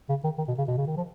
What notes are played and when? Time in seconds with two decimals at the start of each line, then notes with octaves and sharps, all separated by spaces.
0.09 C#3
0.24 D#3
0.38 D#3
0.48 B2
0.58 C#3
0.68 B2
0.78 C#3
0.87 D#3
0.97 F3